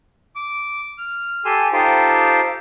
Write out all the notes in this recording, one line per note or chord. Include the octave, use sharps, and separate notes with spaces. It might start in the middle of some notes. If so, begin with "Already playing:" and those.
D6
F6
G4 A4 G#5 C6 E6
D#4 F4 G4 A4 C5 G5